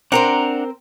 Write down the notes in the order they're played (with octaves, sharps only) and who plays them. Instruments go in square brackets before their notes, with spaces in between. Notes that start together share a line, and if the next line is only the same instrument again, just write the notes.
[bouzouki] C4 A#4 C5 [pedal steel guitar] D4 F#5 A#5